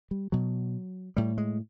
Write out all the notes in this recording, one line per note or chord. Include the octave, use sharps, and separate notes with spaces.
G3
B2 F#3
A2 G3
G#3